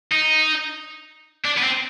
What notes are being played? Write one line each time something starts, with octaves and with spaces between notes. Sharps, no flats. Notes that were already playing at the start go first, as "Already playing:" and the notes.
D#4
D4
B3
C4